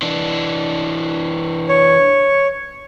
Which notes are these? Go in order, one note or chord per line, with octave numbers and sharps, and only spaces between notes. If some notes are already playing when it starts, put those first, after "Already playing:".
E3 D4
C#5